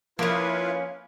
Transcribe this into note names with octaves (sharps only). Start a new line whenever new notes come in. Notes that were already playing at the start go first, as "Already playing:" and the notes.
F3 A#3 C#4 E4 F4 A#4 B4